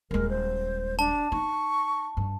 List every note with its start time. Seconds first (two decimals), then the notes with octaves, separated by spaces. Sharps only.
0.11 D#1 G#3 A#4
0.29 C5
0.99 D4 A5
1.32 D#4 C#6
2.17 G2